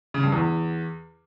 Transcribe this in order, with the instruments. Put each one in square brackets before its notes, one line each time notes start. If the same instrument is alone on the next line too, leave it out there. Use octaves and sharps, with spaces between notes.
[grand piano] C#3
G2
E2